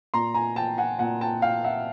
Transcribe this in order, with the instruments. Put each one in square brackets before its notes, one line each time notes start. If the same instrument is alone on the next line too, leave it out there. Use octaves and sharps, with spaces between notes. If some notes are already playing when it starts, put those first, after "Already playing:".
[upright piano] A#2 A#5 C6
G#5 A#5
G5 A5
F#5 G#5
A#2 F#5 G#5
G5 A5
F5 G5
E5 F#5